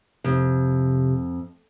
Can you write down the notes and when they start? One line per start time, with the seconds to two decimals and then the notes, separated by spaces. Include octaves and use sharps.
0.24 F2 C3